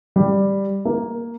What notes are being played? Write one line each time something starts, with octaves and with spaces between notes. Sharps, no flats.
G3
A#3